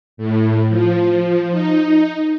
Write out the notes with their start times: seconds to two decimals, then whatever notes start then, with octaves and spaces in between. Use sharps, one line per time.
0.17 A2
0.69 F3
1.51 D#4